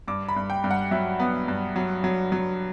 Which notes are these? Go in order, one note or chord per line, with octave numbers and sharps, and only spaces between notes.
G2 D6
B5
G2
G5
G2
F#5
F#3 E5
B3
G2
F#3
F#3
F#3